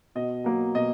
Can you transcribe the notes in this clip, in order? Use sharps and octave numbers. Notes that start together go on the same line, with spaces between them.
B2 D#5
F#3 A#3
B2 D#5